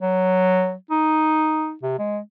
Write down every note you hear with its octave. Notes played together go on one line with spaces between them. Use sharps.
F#3
D#4
C3
G#3